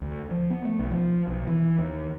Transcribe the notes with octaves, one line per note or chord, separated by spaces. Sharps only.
D2
F3
B3
A3
B1
F3
B1
E3
D#2